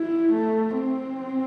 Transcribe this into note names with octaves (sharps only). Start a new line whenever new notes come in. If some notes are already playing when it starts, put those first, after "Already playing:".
Already playing: E4
A3
C4